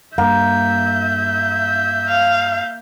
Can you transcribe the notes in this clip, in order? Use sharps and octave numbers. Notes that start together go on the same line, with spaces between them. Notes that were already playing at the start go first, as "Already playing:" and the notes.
G2 A#3 E5 G6
F5